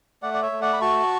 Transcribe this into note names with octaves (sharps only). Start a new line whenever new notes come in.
A3 D5 F#5
D5
C#5 E5
A3
D5 F#5
B5
F#4 A5 C#6